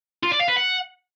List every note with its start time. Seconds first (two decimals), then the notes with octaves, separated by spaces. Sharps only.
0.23 F4
0.31 D5
0.40 F5
0.48 B4
0.56 F#5